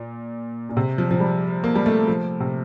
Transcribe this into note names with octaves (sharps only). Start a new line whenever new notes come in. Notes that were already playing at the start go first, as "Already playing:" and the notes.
Already playing: A#2
A#2
C3
F3
F3
G3
A#3
G3
A3
F3
C3